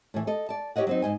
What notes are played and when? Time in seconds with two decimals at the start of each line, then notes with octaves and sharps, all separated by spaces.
0.14 A2 E3
0.27 A4 D#5
0.49 D5 A5
0.76 E4 G4 A4 C#5 D#5 F#5
0.87 F#3 C4 D#4
1.02 G#2 D#5 G#5